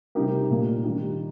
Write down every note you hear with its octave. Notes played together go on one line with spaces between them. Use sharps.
C3 G3 D#4 G4 A#4
A#2 A#3 D#4
D#3 G3 D#4 G4